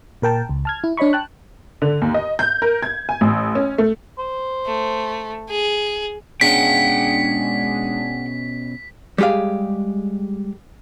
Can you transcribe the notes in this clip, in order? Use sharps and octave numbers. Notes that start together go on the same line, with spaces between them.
A#2 A#4 G5 A5
C#2
A5 F6 G#6
E4
D4 C#5 D#5 B5 C#6
G5 A5 F#6
D3
D#2
D#5
G6
A#4
G#6
G#5
A1
C#4
A3
C5
A3
G#4
B2 G#3 C#4 D4 G#4 F#5 G5 B6
G3 G#3 G4 G#4 F5